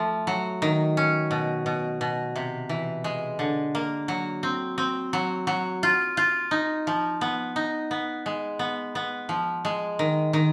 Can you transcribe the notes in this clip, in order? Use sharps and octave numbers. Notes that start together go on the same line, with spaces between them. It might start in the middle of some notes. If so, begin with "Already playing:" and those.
Already playing: F3 A3
F#3
D#3
C#4
B2
B2
B2
C3
E3
G#3
D3
A#3
F#3
C4
C4
F#3
F#3
F4
F4
D#4
F3
B3
D#4
B3
G#3
B3
B3
F3
G#3
D#3
D#3